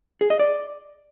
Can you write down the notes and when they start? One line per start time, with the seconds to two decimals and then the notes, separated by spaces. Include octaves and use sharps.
0.21 G#4
0.30 D#5
0.39 D5